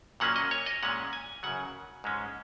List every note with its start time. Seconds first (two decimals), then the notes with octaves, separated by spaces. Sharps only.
0.20 A#2 F#3 A#3 C#4 F#5
0.36 D#5
0.51 C#5
0.66 D#5
0.83 A#2 G#3 C#4 F#5
1.13 G#5
1.43 F#2 C#3 F#3 F#5
2.04 G#2 G#3 C#4